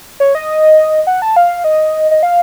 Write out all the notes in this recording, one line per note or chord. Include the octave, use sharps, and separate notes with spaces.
C#5
D#5
F#5
A5
F5
D#5
D#5
F5